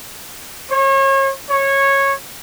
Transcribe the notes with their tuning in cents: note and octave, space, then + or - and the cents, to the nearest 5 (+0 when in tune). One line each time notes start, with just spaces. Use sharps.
C#5 -35
C#5 -15